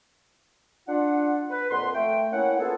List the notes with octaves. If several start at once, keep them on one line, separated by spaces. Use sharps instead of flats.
D4 F4 F#5
B4
F2 A#2 F#5 C6
A3 G5
A#3 C#4 E4 F#5
A#3 B3 E4 F4 G#4 A4